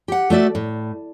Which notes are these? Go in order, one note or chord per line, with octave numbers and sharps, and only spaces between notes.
G4 F#5
A3 F#4 D5 E5
A2